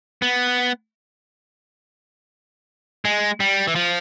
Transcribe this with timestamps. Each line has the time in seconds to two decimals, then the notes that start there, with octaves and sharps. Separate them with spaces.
0.22 B3
3.05 G#3
3.40 G3
3.67 E3
3.75 F3